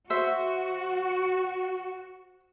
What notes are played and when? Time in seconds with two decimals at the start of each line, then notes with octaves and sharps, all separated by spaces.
0.10 F#4 C5 E5